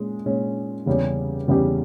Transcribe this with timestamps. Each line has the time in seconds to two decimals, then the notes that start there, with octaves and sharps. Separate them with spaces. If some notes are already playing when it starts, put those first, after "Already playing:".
Already playing: A#2 G#3 C#4
0.25 A#2 G#3 C#4
0.86 E2 C#3 G3 C#4 G4
1.48 E2 C#3 G3 C#4 G4